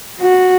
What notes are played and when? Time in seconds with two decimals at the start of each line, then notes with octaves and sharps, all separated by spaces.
0.21 F#4